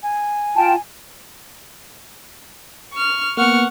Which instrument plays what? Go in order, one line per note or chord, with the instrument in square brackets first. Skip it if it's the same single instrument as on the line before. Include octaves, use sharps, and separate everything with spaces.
[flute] G#5
[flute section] F4 G5 A5
[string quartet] C#6 F6
[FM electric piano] A#3 B3 [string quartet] F#5 C#6 F6